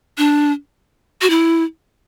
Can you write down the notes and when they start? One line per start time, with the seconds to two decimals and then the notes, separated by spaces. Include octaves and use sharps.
0.18 D4
1.21 F#4
1.30 E4